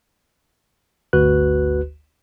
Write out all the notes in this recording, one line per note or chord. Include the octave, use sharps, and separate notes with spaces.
G1 D2 F#4 B4 F#6